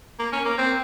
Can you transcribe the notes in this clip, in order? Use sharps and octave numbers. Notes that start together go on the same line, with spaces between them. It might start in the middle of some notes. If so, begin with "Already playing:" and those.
A#3
C#4
A#3
C4